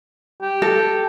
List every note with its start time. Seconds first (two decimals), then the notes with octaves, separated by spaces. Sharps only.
0.41 G4
0.62 A4